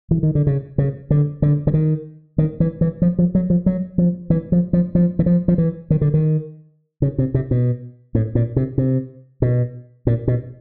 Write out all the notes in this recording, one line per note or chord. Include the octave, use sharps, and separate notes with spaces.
E3
D#3
D3
C#3
C#3
D3
D3
D3
D#3
D#3
E3
E3
F3
F3
F#3
F3
F#3
F3
E3
F3
F3
F3
E3
F3
F3
E3
D#3
D3
D#3
C#3
C3
C3
B2
A2
A#2
C3
C3
B2
A#2
B2